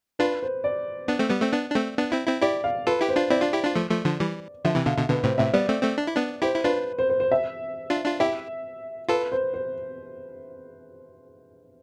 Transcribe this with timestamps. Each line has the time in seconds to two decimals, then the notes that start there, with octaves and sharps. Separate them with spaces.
0.19 D4 F4 B4
0.43 C5
0.64 D5
1.08 B3 D4
1.19 A3 C4
1.30 G3 B3
1.42 A3 C4
1.53 B3 D4
1.70 D4
1.75 A3 C4
1.98 B3 D4
2.12 C4 E4
2.27 C4 E4
2.42 E4 G4 D5
2.64 F5
2.87 F4 A4 B4
3.01 E4 G4
3.09 C5
3.16 D4 F4
3.30 C4 E4 D5
3.42 D4 F4
3.53 E4 G4
3.64 D4 F4
3.75 F3 A3
3.90 F3 A3
4.05 D3 F3
4.20 E3 G3
4.65 D3 F3 E5
4.75 C3 E3
4.86 B2 D3 F5
4.97 B2 D3
5.09 B2 D3 B4
5.23 A2 C3 C5
5.38 A2 C3 E5
5.54 G3 B3 D5
5.69 A3 C4
5.83 A3 C4
5.98 D4
6.07 E4
6.16 B3 D4
6.42 E4 G4 C5
6.55 E4
6.64 D4 F4 B4
6.99 C5
7.10 C5
7.20 C5
7.32 E5
7.90 D4 F4
8.05 D4 F4
8.20 E4 G4 E5
9.09 F4 A4 B4
9.32 C5
9.54 C5